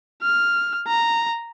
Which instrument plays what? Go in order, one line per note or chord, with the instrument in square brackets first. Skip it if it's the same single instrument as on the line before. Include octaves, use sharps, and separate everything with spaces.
[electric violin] F6
A#5